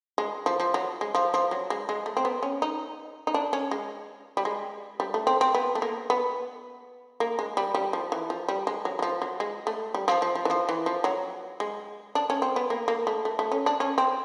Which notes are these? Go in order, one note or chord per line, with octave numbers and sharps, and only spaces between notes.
G#3
F3
F3
F#3
G#3
F3
F3
F#3
G#3
G#3
A3
C4
B3
C#4
D#4
D#4
D4
C#4
G#3
G3
G#3
G3
A3
C4
C4
B3
A3
A#3
B3
A#3
G#3
G3
G3
F3
E3
F3
G3
G#3
F#3
F#3
F3
F#3
G#3
A3
G3
F3
F3
F3
E3
F3
E3
F3
F#3
G#3
D4
C#4
C4
B3
A#3
A#3
A3
A3
A3
C#4
D4
C#4
C4